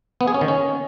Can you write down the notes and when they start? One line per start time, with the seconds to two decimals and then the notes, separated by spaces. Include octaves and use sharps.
0.21 B3
0.28 G#4
0.34 C#4
0.41 D#3
0.48 C#4